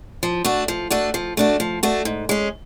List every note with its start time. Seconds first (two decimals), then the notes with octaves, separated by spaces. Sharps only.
0.23 F3
0.45 A3 D4 F#4
0.68 F3
0.90 A3 D4 F#4
1.14 F3
1.37 A3 D4 F#4
1.60 F3
1.83 A3 D4 F#4
2.05 G#2
2.29 G#3 C#4